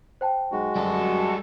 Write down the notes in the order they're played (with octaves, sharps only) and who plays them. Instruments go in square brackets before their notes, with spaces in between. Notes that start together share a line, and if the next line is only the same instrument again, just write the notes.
[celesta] C5 G5 A5
[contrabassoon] B1 [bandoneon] G#3 F#4
[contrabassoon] F#2 [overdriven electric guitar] G3 A4